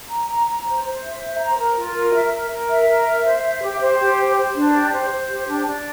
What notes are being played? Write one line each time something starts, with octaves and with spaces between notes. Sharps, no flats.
A#5
A#5
A#5
C5
C5
E5
C5
A#5
A#4
F4
A#4
E5
A#4
A#4
E5
A#4
E5
C5
E5
G4
C5
G4
C5
C5
D4
G4
C5
C5
G4
D4
D4